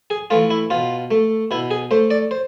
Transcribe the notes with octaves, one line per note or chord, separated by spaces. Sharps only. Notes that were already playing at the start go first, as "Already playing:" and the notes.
G#4
E3 A3 F4
E4
B2 F4
A3
B2 E4
G#4
A3 C5
D5
C5